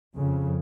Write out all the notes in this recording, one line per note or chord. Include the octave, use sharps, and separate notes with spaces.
F2 C#3